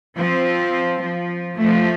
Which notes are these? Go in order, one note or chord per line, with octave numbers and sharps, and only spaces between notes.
F3 C4
F3
F3 A3